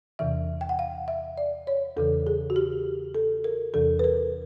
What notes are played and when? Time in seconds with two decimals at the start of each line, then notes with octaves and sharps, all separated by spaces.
0.19 E2 C3 E3 E5
0.61 G5
0.69 F#5
0.79 F5
1.08 E5
1.38 D5
1.67 C#5
1.97 E2 C#3 E3 A4
2.27 G#4
2.50 F#4
2.56 G4
3.15 A4
3.44 A#4
3.74 E2 C3 E3 A4
3.99 B4
4.04 A#4